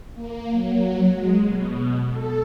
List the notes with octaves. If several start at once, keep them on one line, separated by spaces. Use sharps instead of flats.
A#3
F#3
G#3
B2
A4